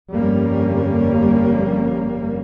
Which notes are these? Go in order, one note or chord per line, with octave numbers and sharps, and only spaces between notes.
G1 F2 G3 A#3 C#4